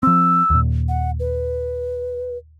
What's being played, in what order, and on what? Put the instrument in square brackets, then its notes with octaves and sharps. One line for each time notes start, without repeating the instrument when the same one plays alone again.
[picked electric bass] F3 C4 [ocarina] E6
[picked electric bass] D#2 A#2
[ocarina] F#5
B4